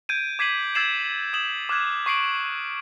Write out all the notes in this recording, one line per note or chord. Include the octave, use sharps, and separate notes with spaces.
G6 G#6 D7 D#7
D6 G#6 B6 C7 D#7 F#7
E6 G#6 A6 C7 E7 F#7
D#6 E7 F#7
D6 F6 F#6 G#6 E7
C#6 C7 D7 F#7